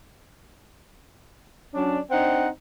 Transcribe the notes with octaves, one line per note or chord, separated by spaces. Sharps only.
F#3 C#4 D4
C4 D4 D#4 C5 F#5